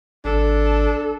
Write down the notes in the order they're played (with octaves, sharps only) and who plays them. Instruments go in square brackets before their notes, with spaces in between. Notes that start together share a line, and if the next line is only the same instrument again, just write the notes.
[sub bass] G#1 [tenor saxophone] D4 [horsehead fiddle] A4